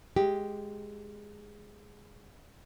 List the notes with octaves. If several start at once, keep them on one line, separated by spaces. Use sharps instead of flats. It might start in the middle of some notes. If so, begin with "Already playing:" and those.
G#3 G4